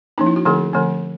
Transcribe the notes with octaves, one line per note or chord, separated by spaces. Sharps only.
F3 A#3 C#4 D#4
E4
F#4
D3 F3 A3 C4 G#4
D3 F3 A3 C4